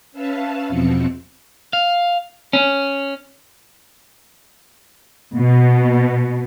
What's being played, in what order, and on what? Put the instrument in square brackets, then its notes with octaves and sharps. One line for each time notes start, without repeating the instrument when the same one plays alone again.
[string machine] C#4 B4 E5 F5 A5
E2 B2 F3 C4 C#7
[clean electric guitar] F5
C#4
[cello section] B2